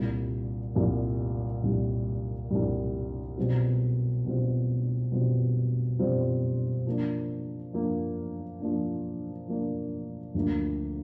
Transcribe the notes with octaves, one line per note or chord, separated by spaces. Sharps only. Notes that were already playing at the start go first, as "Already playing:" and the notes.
Already playing: C2 A#2 G3
C2 A#2 G3
C2 A#2 G3
C2 A#2 G3
B2 G3 C4 F4
B2 G3 C4 F4
B2 G3 C4 F4
B2 G3 C4 F4
F3 A#3 D4
F3 A#3 D4
F3 A#3 D4
F3 A#3 D4
D2 D3 F3 A#3